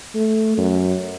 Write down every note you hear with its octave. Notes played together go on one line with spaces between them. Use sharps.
A3
F#2